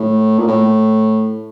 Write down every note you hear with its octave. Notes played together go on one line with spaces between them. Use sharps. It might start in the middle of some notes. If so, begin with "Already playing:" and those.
Already playing: A2
A#2
A2